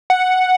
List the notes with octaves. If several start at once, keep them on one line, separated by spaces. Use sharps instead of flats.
F#5